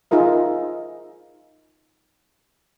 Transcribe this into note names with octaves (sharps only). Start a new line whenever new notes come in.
D#4 F4 G#4 A#4 E5